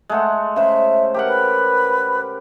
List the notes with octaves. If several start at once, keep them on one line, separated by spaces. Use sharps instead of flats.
G#3 A3 F#5
C#3 C5 E5
G4 A#4 F#5
B4